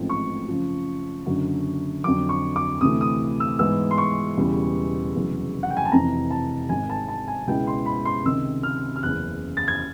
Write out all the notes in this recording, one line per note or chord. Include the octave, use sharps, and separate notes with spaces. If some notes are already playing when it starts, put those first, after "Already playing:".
Already playing: A1 G#2 F3 A3 C4
C#6
F#2 C#3 F3
F#1 F#2 D3 F#3
F2 D3 F#3 D6
C#6
D6
D2 C3 E3 A3 D#6
D#6
E6
G#2 E3 G#3 B3 E4 E6
C6
C#6
E1 E2 C#3 E3 G3
F1 E2 C#3 F#3
F#5
G5
G#5
A5
F1 F2 C3 E3 A#5
A5
G#1 G#2 D#3 G#5
A5
A5
G#5
C#2 B2 G#3 B3 E4 G5
C6
B5
C6
C#2 C3 D#3 E6
F6
F6
F#1 E2 C#3 F#6
A6
G#6